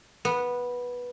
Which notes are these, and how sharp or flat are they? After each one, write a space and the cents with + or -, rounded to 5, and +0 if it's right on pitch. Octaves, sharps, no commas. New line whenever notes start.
B3 -10